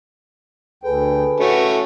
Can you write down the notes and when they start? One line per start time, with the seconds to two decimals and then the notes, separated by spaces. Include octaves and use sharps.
0.83 D2 G#4 A4 B4 G5
1.40 A3 C#4 F#4